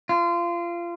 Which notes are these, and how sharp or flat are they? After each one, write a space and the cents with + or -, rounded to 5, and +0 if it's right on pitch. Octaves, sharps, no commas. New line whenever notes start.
F4 -25